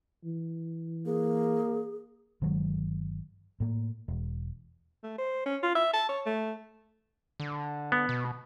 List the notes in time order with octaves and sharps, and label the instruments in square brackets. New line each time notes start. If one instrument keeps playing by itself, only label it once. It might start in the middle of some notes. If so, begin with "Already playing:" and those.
[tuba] E3
[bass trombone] A#3 [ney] G#4
[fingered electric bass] G1 D#3 F#3 G#3
A2 A#3
E1
[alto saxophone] A3
C5
C#4
F4
E5
A5
C#5
A3
[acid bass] D3
[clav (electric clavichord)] B3
[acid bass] B2